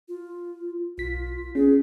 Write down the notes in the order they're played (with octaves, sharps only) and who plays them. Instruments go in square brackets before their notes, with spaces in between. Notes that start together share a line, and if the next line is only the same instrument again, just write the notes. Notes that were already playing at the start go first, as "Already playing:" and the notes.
[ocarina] F4
[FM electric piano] B1 B6 [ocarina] F4
[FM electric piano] C#4 [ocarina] G#4